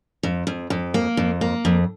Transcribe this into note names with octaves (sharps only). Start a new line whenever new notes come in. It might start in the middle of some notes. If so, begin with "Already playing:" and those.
F2
F2
F2
A#3
F2
A#3
F2